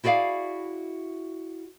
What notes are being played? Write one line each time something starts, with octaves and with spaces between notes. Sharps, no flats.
E4 F#4 G#4 D5 F5